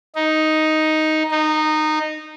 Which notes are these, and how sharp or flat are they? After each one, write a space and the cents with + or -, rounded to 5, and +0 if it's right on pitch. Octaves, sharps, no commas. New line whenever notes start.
D#4 +5
D#4 -15